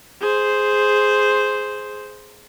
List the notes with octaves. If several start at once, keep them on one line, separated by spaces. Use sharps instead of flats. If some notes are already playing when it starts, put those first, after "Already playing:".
G#4 C5